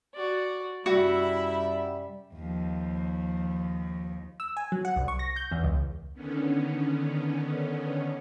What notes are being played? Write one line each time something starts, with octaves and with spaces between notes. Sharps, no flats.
F#4 D5
F#2 C3 G3 E4 F#4 E5
D#2 F3
E6
G#5
F#3
F#5
C2
C#6
A#6
G6
E2
C#2
D3 D#3 B3 C#4